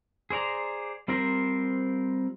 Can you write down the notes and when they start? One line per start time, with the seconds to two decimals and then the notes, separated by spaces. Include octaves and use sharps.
0.30 G#4 C5 D5 A#5
1.08 G3 C4 F4 A#4 C5